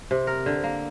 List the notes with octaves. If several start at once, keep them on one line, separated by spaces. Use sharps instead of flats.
C3
A#4
D3
A#3